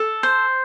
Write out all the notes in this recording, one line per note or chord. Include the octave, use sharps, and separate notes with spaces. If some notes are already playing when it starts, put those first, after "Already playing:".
Already playing: A4
C5